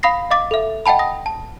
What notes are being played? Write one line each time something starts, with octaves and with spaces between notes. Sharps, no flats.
F5 B5 D#6 A#6 C7
D#5 F5 D6 A6
A4 E5
D#5 F#5 G5 A5 B5
D#6 A#6
A5